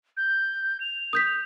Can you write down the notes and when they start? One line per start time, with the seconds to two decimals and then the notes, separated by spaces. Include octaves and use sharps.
0.17 G6
0.80 F7
1.13 D#6 G6 B6